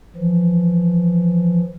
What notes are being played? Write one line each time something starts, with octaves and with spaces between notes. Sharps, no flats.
E3 F3